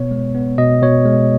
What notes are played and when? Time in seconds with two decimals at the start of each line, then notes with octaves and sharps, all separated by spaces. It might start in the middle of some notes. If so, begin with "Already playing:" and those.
Already playing: B2 B3 C#5
0.11 G#3
0.35 B3
0.58 B2 D#5
0.82 B2 C#5
1.06 G#3